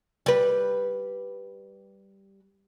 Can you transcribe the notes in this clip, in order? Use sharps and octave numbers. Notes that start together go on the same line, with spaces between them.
G3 B4